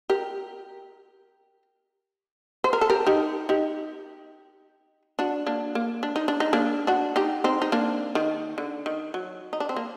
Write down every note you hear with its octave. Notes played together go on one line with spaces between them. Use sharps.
G4 A#4
C5
A#4
A4
G4 A#4
D#4 G4
D#4 G4
D4 F#4
A#3 D4
A#3
D4
D#4
D4
D#4
A#3 D4
D4 F#4
D#4 G4
C4 D#4
D#4
A#3 D4
D#3
D3
D#3
F#3
D#4
D4
C4
A#3